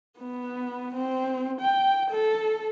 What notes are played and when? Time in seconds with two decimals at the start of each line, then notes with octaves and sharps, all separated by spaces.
0.19 B3
0.94 C4
1.61 G5
2.11 A4